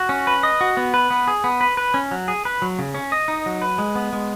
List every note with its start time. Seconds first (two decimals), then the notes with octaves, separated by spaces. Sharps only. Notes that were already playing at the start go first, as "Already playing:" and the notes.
Already playing: F#4
0.09 C#4
0.27 B4
0.43 D#5
0.61 F#4
0.77 B3
0.94 B4
1.10 B3
1.27 G#4
1.44 B3
1.61 B4
1.77 B4
1.94 C#4
2.11 F#3
2.28 G#4
2.45 B4
2.62 F#3
2.79 C#3
2.94 C#4
3.12 D#5
3.28 D#4
3.46 F#3
3.62 B4
3.78 G#3
3.95 B3
4.13 G#3